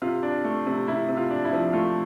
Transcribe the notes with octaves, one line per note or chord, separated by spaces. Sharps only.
C3 F4
D4
A3
C3
C3 E4
C3
F4
D4
E4
F3
A3 F4